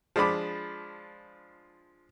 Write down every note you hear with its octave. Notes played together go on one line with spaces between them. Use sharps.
F3 G#3 D4 B5 D6